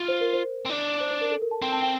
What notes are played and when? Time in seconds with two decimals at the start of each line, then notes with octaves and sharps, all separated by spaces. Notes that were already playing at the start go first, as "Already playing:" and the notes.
Already playing: F4
0.08 C5
0.21 A#4
0.33 C5
0.65 C4
0.69 D4
1.01 C5
1.11 C5
1.21 A#4
1.31 A4
1.42 A#4
1.51 A5
1.62 C4 G5
1.72 A5
1.82 G5